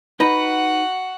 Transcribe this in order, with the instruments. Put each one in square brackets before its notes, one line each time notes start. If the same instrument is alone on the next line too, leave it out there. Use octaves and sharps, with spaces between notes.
[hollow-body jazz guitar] D#4 D#5 A#5 [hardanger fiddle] F#4 F#5 [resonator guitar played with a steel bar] B4